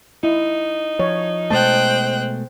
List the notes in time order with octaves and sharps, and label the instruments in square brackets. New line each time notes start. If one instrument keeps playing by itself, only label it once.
[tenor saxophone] D#4 [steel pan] E4
[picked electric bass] F3 [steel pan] C#5
[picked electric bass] B2 G#3 A3 [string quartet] C5 G5 F#6 [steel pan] A5